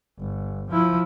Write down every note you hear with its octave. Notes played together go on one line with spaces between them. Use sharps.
G1
F3 E4